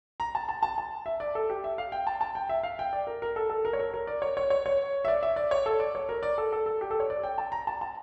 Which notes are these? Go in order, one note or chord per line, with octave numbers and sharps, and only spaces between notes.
A#5
A5
A5
A5
A5
E5
D5
A4
G4
E5
F5
G5
A5
A5
G5
E5
F5
G5
D5
A#4
A#4
A4
A4
A#4
C#5
A#4
A#4
D5
C#5
C#5
C#5
C#5
E5
D5
E5
D5
C#5
A4
D5
C#5
A#4
D5
A4
A4
A4
G4
A4
C#5
D5
G5
A5
A#5
A5
A5